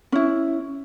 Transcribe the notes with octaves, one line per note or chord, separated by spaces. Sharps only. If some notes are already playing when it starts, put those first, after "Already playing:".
C#4 E4